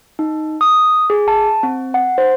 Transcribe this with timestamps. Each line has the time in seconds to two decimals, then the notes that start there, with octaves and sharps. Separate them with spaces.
0.19 D#4
0.61 D#6
1.10 G#4
1.28 A5
1.63 C4
1.94 F#5
2.18 C5